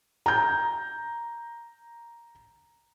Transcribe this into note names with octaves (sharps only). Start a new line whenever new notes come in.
A#5 G6